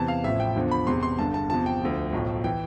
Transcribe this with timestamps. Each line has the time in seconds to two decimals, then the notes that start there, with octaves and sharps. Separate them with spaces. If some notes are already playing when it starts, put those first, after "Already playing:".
Already playing: E2 C3 E3 A5
0.08 F5
0.24 A1 A2 F3 E5
0.40 G5
0.56 E2 D3 F3
0.71 B5
0.87 E1 E2 C3 C6
1.03 C6
1.19 G1 G2 D3 A5
1.34 A5
1.50 E2 C3 F3 A5
1.66 G5
1.82 D2 D3 F3
2.13 B1 A2 F3
2.44 E3 G5